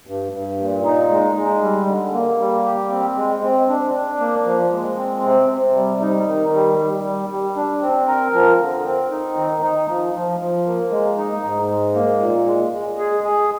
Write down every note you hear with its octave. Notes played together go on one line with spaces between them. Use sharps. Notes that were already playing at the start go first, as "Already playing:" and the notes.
G2
G2
A#2
D#4
G#3
G#3
G3
D3
A#3
G3
G4
C4
G#3
C4
D4
D4
A#3
F3
G#3
C4
C3
C3
G3
D#4
D#3
G3
G3
G3
G3
D4
C4
A#4
F3
D3
C4
D#4
D#3
D#4
F3
F3
F3
A#3
G#3
D#4
G#2
G#3
A#3
A#2
G#3
G#3
G#4
G#4